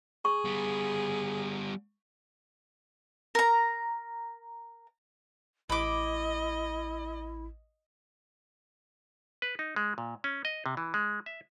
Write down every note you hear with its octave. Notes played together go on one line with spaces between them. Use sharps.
G#4 C#6
G3 B3
A#4 A#5
A1 E4 D#5 B5 D6
B4
D#4
G#3
A#2
C#4
D#5
C3
E3
G#3
E5